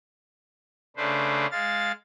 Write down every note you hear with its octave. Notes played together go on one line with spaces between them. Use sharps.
C#3 A3 D4 B4 C5
G#3 F5 A6